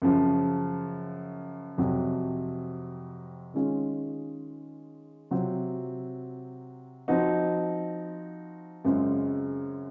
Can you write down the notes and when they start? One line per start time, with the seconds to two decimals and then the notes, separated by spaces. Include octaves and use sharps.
0.02 F#2 C#3 F3
1.78 F2 C3 F#3
3.54 D#3 G#3 C#4 F4
5.31 C3 F#3 C4 F4
7.08 F3 C4 D#4 F#4
8.84 F#2 C#3 G#3 C4 F4